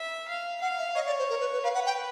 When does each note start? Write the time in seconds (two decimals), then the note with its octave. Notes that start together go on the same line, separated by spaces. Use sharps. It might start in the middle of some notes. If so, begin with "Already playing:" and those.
Already playing: E5
0.28 F5
0.61 F5 F#5
0.79 E5
0.95 C#5 D#5
1.07 D5
1.19 C5
1.30 A#4
1.41 B4
1.53 B4
1.63 B4 F5
1.74 F#5
1.86 G5